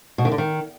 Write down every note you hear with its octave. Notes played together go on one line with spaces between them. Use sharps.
B2
D#3
D3
D#3